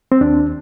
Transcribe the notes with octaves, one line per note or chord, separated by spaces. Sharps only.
C4
D#2 D4